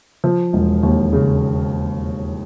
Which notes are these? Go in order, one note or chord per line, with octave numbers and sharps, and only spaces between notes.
F3
E1
D#2
C#3